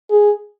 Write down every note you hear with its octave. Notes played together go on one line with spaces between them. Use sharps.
G#4